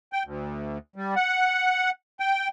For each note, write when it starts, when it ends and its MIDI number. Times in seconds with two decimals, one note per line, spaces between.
0.13 0.23 79
0.25 0.78 38
0.96 1.15 55
1.16 1.90 78
2.20 2.48 79